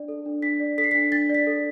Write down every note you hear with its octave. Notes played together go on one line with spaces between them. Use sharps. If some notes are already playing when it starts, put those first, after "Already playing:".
Already playing: D4 D5
A4
D4
D4 B6
D5
A4 B6
C7
D4 B6
D4 A6
D5
B6
A4